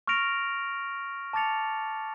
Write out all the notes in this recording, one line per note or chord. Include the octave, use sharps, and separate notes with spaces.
C#6 F6 A#6 D7 F7
A5 D6 A6 C#7 F7